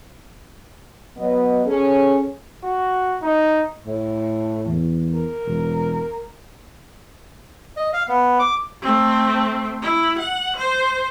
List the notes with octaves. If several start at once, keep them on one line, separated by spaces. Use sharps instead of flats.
F#3 B3 D#5
C#4 G#4 A4
F#4
D#4
A2
E2
A#4
E1
D#5
F5
B3
D6
A3 C4
E4
F#5
C5